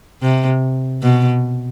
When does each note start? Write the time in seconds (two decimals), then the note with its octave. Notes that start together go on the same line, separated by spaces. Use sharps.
0.22 C3
1.02 B2